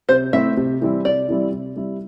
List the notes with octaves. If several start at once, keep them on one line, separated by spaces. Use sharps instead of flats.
C3 C5
A3 C4 E4 E5
C3
E3 G3 C4 E4
C3 D5
E3 G3 C4 E4
C3
G3 C4 E4